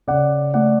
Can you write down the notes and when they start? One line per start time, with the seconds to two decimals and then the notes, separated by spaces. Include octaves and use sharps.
0.07 C#3 D5 F#5
0.54 A3 D5 F#5